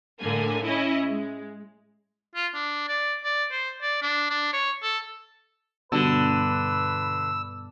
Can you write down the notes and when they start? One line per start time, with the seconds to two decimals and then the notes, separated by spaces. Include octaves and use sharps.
0.19 A2 D3 A#3 G#5
0.64 C#4 E4 D#5
1.07 G#3
2.35 F4
2.54 D4
2.88 D5
3.24 D5
3.52 C5
3.82 D5
4.02 D4
4.30 D4
4.53 C#5
4.83 A4
5.92 G2 B2 D3 B4 E6